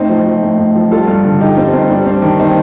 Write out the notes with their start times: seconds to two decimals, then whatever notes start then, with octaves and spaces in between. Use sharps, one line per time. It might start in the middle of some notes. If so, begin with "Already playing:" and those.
Already playing: A2 C4 D#4
0.10 F3
0.26 F3
0.42 A2
0.58 A2
0.76 F3
0.91 G3 F4 A4
1.08 G2
1.25 D3
1.40 G2 D#4 G4
1.57 G3 C4
1.73 G2 C4 D#4
1.90 G3 D4
2.06 G2 C4
2.22 D#3 D4
2.39 C4 D#4